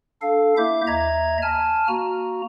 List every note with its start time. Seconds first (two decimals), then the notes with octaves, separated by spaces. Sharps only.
0.22 D4 A4 F5
0.57 A#3 E4 E5 D6 G6
0.87 D#2 D#5 E5 A#5 G#6
1.42 G#5 A5 F6
1.88 A#3 F#4 A#5